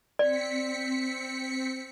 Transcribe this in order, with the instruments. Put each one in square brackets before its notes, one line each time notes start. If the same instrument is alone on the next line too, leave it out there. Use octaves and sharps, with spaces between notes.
[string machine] C4 B6 C#7 [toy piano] D5